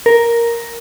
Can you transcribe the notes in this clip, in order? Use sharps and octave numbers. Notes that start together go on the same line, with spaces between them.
A#4